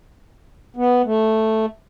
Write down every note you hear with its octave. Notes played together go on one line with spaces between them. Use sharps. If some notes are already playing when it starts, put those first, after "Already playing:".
B3
A3